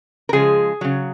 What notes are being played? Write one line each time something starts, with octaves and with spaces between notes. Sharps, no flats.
A#4
C#3 F3 G#3 G#4
C#3 F#3